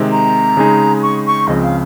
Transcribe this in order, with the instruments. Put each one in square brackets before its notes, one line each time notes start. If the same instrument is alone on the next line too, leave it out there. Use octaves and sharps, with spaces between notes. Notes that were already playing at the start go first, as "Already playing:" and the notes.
Already playing: [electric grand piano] C3 D#3 G#3 C4 D#4
[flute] A#5
[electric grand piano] C#3 G#3 D#4 G#4
[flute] C#6
C#6
[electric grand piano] C#2 C#3 F3 C4 [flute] D#5
[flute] F5